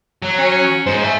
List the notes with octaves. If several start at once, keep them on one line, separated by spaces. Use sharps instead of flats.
F#3
C#4
G#2 C5
E5 A5